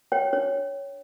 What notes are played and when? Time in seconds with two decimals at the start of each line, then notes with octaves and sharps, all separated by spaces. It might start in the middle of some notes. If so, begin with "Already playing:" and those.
0.12 C#5 G5
0.33 D4 C#5